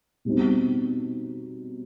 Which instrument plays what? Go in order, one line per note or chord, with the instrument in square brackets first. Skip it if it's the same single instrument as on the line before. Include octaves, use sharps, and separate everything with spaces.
[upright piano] B2 G3 C4 D#4